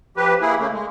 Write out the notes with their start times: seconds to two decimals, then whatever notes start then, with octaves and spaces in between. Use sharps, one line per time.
0.17 F3 G4 B4
0.41 A#3 E4 G#4
0.59 C#3 A3 A#3
0.72 G#3